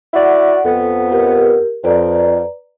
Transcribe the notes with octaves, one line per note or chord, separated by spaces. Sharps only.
E4 F#4 D5 F#5
F2 B3 A4 F#5
G4 A#4
F2 B4 D5 A#5